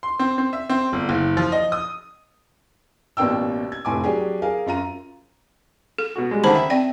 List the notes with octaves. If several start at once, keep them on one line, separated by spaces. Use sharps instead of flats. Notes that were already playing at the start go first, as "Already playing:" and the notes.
C6
C4
C4
E5
C4
G1
F#1
F3
D#5
D#6
A1 B2 A#3 D4 G5 E6
G#6
F1 A2 G#5 D6
F#3 D4 G4 G#4
G#4 A#4 F5
F#2 F4 A#5 D#7
A4
B2 F#4
G3 G#3
D3 D#3 C5 A5 B5
E5
C4 D5 G5